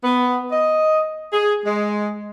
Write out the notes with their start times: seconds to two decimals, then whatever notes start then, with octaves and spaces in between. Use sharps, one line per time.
0.04 B3
0.52 D#5
1.33 G#4
1.65 G#3